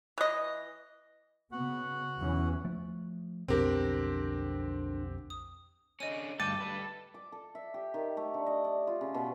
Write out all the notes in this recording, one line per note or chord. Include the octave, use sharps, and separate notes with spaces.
E3 D#5
C#3 B3 F#4 F#5
E2 E3 C#4
F3 A3
B1 F2 D3 C4 G4 A#4
D#6
D3 C#4 D#5 D#7
D2 G2 A4 G5 D6 A6 D#7
G3 B4
D6
A4
E5
G4
D#3
A3
D3
D#5
D5
F4
C#3
B2